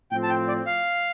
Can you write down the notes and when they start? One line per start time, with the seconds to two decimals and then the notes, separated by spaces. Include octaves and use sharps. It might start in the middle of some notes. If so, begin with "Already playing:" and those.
0.12 A2 F3 C4 G5
0.23 A5
0.30 G5
0.48 D5
0.66 F5